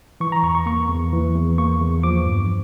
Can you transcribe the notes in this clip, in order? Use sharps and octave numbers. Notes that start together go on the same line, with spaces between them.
E3 C#6
A#5
E2 C#6
C#6
A#3 C#6
E2
E3
E2
A#3 C#6
E2
F3 D6
G2